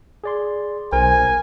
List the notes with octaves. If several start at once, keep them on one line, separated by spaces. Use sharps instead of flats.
G#4 D5 C6
B1 A#4 C5 G#5